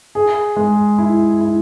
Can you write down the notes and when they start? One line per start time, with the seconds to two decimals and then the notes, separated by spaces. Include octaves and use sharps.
0.15 G#4
0.57 G#3
0.98 E4
1.40 E4